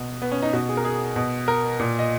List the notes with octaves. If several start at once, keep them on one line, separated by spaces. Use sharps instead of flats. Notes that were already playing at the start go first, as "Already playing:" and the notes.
Already playing: B2
B3
C#4
D#4
B2 F#4
G#4
A#4
G#4
B2
A#4
A#2
D#5